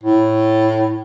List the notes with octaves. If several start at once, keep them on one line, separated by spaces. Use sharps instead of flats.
A2